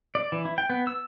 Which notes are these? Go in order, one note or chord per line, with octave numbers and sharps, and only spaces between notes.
D5
E3
E4
G5
B3
E6